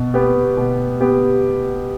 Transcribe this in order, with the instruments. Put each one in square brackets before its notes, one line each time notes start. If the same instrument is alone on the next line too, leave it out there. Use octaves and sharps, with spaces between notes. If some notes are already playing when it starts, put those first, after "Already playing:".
Already playing: [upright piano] B2
B3 G4
B2
B3 G4